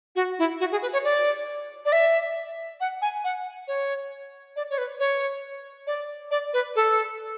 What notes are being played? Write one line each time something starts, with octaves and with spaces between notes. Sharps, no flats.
F#4
E4
F#4
G#4
B4
C#5
D5
D5
E5
F#5
G#5
F#5
C#5
D5
C#5
B4
C#5
D5
D5
B4
A4